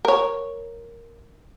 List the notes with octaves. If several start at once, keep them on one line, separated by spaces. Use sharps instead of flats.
A#4 C#5